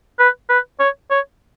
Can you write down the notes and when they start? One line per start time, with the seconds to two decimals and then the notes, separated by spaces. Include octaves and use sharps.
0.19 B4
0.49 B4
0.80 C#5
1.11 C#5